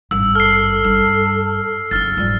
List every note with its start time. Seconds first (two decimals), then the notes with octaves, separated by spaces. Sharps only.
0.11 G#1 G2 E6
0.35 A4 F6 C7
0.84 G2
1.91 F#1 F#2 F6 A6
2.17 G#2 F3 G3